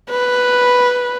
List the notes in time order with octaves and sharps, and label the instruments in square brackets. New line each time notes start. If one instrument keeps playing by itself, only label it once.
[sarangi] B4